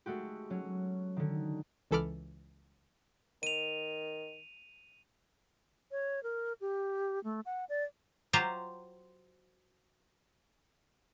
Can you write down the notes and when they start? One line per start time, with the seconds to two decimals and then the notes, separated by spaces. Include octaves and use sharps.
0.06 G#3 A3 F#4 G4
0.50 F#3 C#4
1.17 D3 D#3
1.91 C#2 E3 A4 B5 D6 F6
3.43 D#3 D#7 F7
5.91 C#5
6.23 A#4
6.61 G4
7.24 A3
7.46 F#5
7.69 D5
8.33 F#3 F4 G4 C5 F5 A#5